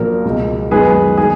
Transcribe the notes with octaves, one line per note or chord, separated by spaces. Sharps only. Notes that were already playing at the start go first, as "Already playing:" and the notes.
Already playing: A#1 A#2 F#3 A#3 A#4
C#2 B2 G#3
F#2 D#3 G#3 B3 G#4 B4
D#3 G#3 G#4